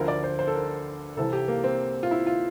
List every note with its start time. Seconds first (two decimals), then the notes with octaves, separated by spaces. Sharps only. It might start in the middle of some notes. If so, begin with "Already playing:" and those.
Already playing: D2 D3 F3 A#4
0.08 D5
0.24 C5
0.39 C5
0.48 A4
0.54 A#4
1.17 C2 C3 E3 A4
1.33 G4
1.48 A#3
1.64 C4
2.03 F4
2.11 E4
2.27 F4